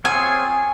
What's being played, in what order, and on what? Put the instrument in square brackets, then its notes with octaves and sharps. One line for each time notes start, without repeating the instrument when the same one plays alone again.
[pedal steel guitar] C4 F4 G#4 C#5 [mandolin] G#5